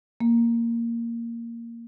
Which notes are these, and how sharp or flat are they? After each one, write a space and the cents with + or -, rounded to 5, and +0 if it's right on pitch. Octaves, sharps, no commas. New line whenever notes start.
A#3 -5